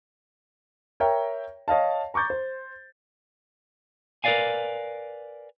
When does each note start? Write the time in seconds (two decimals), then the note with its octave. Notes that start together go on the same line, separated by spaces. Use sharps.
1.00 A#4 C#5 E5 G5 A#5
1.68 C#5 D#5 F5 A5
2.14 A#5 C#6 D6 G6 A6
2.30 C5
4.24 A#4 B4 C#5 D5 F5 G#5